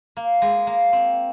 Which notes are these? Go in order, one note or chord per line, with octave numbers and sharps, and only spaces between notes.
A#3
G#3
A#3
C4